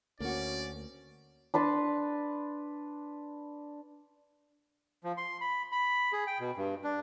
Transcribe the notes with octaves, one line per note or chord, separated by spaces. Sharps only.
D2 A#3 C#4 F#4 D5
D4 B4 A5 C6
F3
C6
B5
B5
G#4
G5
B2
G2
D4